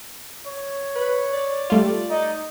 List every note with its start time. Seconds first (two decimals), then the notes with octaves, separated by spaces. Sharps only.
0.46 C#5
0.96 B4
1.33 D5
1.70 G3 A3 F4
2.11 D#4